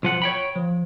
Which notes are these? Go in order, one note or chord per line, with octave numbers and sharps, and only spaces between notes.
B1 F3 F#5
C#5 G5 B5
F3